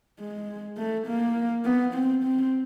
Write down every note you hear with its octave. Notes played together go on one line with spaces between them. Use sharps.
G#3
A3
A#3
B3
C4
C4